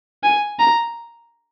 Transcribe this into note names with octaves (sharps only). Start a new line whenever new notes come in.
G#5
A#5